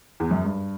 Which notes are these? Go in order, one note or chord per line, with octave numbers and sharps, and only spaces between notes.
E2
F#2
G2